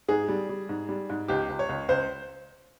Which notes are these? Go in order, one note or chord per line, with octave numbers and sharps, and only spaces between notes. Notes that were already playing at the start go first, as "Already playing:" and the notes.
G#2 G#4
G3
G3
G#2
G3
G#2
C#2 G4
C#2
C#5
C#2
C#2 C5